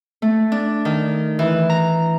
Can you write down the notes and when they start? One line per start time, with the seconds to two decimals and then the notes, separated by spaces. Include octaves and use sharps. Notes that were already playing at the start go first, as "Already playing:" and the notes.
0.22 A3
0.52 D4
0.85 D#3
1.39 E3
1.70 A#5